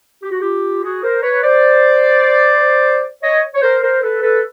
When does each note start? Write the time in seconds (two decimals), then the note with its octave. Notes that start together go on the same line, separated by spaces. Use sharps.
0.23 G4
0.31 F#4
0.41 F4 G4
0.83 F#4 G#4
1.03 A#4 C5
1.22 B4 C#5
1.42 C5 D5
3.23 C#5 D#5
3.54 C#5
3.62 A#4 C5
3.82 A#4 C5
4.02 A4 B4
4.22 A4 B4